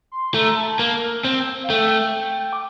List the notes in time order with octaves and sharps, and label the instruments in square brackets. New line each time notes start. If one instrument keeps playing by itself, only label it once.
[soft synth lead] C6
[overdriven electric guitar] A3 [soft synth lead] A#5
[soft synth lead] A5
[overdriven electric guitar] A#3
C4
[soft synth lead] F5
[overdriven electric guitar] A3 [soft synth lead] G5
[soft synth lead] G5
D6